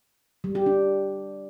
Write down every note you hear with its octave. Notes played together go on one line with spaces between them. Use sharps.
G3
G4
D4